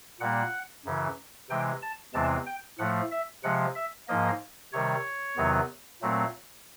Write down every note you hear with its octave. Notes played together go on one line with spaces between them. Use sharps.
A#2 G3 A#3 F#5
F#2 C#3 E3
C3 E3 G#3 G5
A5
E2 C3 E3 G#3 C4 A5
G5
A2 F3 A3 F#5
E5
C3 F3 G#3 F#5
E5
G#2 F3 A#3 D#5
C3 D#3 G3 C#5
E2 C3 D#3 F#3 B3
A#2 F#3 A3 C4